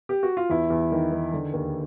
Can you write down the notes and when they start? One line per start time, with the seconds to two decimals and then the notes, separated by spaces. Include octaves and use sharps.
0.09 G4
0.23 F#4
0.37 F4
0.50 E2 E4
0.70 E2
0.91 D#3
1.11 D#3
1.33 D3
1.53 D#2